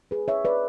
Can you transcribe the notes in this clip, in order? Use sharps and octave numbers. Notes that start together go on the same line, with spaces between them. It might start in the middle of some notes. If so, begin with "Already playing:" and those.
G#4 B4
C#5 E5
B4 D5